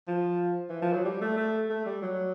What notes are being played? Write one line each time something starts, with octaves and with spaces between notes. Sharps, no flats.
F3
E3
F3
F#3
G3
A3
A3
A3
G3
F#3